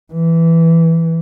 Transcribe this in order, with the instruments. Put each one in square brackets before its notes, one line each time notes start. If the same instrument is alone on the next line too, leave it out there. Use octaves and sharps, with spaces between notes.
[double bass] E3